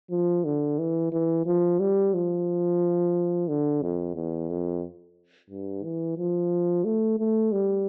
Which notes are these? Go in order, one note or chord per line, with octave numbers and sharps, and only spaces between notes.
F3
D3
E3
E3
F3
G3
F3
D3
F2
E2
F2
G2
E3
F3
A3
A3
G3